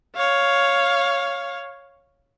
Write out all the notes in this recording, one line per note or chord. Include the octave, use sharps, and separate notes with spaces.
C#5 F5